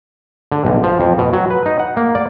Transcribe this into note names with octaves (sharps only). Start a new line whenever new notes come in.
D3
B1
F3
F2
B2
F#3
B4
D#4
F#5
A#3
D5